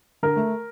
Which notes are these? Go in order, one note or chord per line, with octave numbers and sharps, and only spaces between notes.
D3 A#4
A3